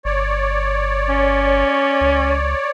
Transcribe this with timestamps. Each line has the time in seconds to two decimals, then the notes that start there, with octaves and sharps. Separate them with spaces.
0.05 G1 C#5 D5
1.09 C#4
2.01 C#2